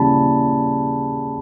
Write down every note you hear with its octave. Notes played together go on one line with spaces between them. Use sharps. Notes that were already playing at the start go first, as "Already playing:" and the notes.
Already playing: C#3 E3 G3 A#3 A5 B5